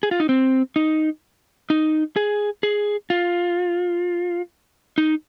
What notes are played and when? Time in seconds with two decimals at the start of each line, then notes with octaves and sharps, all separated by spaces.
0.03 G#4
0.11 F4
0.20 D#4
0.29 C4
0.76 D#4
1.70 D#4
2.16 G#4
2.63 G#4
3.10 F4
4.98 D#4